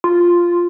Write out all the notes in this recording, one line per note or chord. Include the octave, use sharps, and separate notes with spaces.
F4